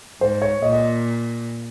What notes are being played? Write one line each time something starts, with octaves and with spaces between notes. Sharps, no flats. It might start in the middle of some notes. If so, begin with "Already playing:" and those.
G#2 C5
C#5
A#2 D#5
D#5